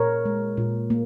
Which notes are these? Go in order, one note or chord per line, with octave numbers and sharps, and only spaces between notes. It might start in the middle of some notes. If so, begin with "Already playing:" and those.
Already playing: A#2 A#4 C#5
G#3
A#2
A#3